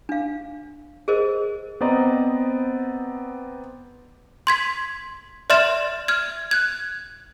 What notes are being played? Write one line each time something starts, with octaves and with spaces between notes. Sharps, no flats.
D4 F5
G#4 A#4 C5 D#5
B3 C4 C5 D5 D#5 A#5
C6 G#6 B6
D5 E5 C6 F6 A6 E7
F6 G#6
F#6 G#6